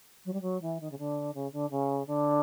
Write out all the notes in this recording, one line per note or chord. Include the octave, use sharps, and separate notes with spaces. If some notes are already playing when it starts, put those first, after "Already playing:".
F#3
G3
F#3
E3
D#3
C#3
D3
C#3
D3
C#3
D3